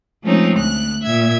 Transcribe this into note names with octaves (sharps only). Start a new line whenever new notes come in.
F3 G#3 A3 C4 C#4 D#4
D2 F#6
A#2 E5 G#6